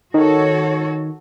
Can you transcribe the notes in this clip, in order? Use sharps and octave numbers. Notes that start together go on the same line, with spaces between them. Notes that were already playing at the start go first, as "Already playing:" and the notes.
D#3 F#4 A4 C#5